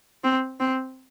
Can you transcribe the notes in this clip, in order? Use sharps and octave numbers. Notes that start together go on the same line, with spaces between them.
C4
C4